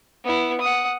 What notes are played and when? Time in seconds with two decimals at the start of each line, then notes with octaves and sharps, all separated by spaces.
0.24 B3 E4
0.61 F#5 D#6